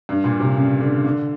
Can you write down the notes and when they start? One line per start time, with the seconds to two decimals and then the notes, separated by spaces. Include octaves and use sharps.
0.09 G2
0.24 A#2
0.40 C3
0.56 C#3
0.80 D3
1.05 D3